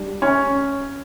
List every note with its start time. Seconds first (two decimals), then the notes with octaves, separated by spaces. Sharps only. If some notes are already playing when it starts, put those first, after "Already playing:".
Already playing: G3 D4
0.22 C#4